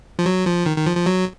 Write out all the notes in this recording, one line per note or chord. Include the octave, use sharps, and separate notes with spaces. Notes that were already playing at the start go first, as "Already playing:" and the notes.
F3
F#3
F3
D#3
D#3
F3
F3
F#3